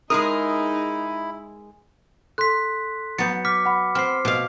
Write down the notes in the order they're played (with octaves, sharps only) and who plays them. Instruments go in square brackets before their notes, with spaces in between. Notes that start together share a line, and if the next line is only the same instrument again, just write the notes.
[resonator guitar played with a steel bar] G#3 G#4 A#4 [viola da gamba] D#4 [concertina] E4 [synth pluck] D#6
[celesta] A4 C6 [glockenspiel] F#6 B6
[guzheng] F#3 B3 [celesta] G6 A6 [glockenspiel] C#7
[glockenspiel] D6 F6 B6
[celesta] F#5 B5
[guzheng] C4 [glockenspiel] F6 C7
[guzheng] B2 F5